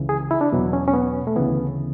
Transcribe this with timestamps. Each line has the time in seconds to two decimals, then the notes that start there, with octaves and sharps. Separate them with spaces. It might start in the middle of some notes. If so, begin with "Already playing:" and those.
Already playing: C#2 C#3 E3
0.09 G#4
0.31 E4
0.41 D4
0.52 E2 B2 F#3
0.73 C#4
0.88 C#4
0.94 B3
1.27 A3
1.36 D2 C#3 E3 B3